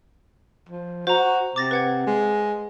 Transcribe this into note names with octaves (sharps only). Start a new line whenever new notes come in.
F3
F#4 C5 A#5
C3 D6 A6 A#6
B4 F#5 G#6
G#3